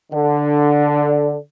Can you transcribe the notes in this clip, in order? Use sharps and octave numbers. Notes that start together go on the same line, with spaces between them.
D3